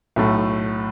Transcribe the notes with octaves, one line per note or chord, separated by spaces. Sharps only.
B1 A2 A3